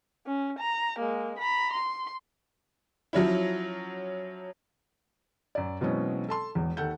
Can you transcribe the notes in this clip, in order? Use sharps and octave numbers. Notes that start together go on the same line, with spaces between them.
C#4
A#5
G#3 A#3
A#5 B5
C6
F3 F#3 C#4 E4
F#2 D5
B2 E3 F#3 G#3 C4 C#4
A4 A5 C6
E1 E2
D#2 D#3 A4 F#5 G6